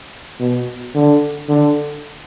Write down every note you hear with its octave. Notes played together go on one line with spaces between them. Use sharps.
B2
D3
D3